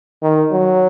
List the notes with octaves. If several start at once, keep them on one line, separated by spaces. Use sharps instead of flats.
D#3
F#3